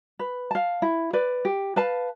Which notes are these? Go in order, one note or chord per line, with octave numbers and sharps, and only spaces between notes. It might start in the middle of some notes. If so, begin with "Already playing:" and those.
B4
F5 A5
E4
B4 D5
G4
B4 F5 A5